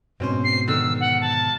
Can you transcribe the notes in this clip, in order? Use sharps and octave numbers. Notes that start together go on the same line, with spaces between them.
G#2 B2 C4 C#4 C5
C7
D3 D#3 E6
F#5
A5